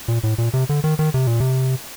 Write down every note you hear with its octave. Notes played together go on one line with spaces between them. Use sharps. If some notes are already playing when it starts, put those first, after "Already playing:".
A#2
A2
A#2
C3
D3
D#3
D#3
C3
A#2
C3